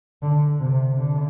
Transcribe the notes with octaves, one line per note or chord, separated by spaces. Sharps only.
D3
C3
D3